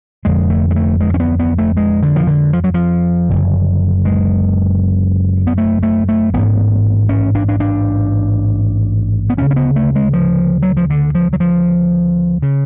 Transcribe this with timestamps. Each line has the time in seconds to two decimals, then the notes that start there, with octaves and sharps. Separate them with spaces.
0.25 F1 F2 D3 G#3
0.50 A3
0.71 G#3
0.76 A3
1.01 G#3
1.14 C#4
1.20 B3
1.40 B3
1.59 A3
1.77 G#3
2.03 D3
2.16 F3
2.27 D3
2.53 F3
2.64 F#3
2.74 F3
3.29 F#1 F#2 D3
4.05 G#3
5.47 B3
5.58 A3
5.83 A3
6.08 A3
6.33 A1 G#2 B3
7.09 C#4
7.35 D4
7.48 D4
7.60 D4
9.29 B3
9.37 D2 C#3 C#4
9.51 C#4
9.56 B3
9.76 A3
9.95 G#3
10.13 F3
10.63 F#3
10.77 F3
10.90 D3
11.15 F3
11.33 F#3
11.40 F3
12.42 C#3